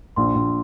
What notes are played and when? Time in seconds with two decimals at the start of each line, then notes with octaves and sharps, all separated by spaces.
0.16 A#1 C6
0.35 A#1